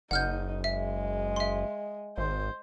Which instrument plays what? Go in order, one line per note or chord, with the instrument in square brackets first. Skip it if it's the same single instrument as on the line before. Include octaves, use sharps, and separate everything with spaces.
[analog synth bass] F#1 [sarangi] D#4 [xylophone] F#5 F6 G6
[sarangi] G#3 [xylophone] E5
[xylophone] E5 C6
[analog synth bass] G#1 [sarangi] C5